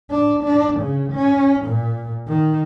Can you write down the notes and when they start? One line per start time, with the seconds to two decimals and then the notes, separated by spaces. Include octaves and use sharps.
0.11 D4
0.44 D4
0.81 C#3
1.13 C#4
1.66 A#2
2.28 D#3